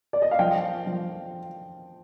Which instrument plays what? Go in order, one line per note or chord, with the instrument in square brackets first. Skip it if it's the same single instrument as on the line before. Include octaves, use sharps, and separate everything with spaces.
[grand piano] D5
D#5
F5
F3 G5
F3